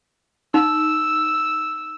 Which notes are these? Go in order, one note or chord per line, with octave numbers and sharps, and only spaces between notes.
D#4 E6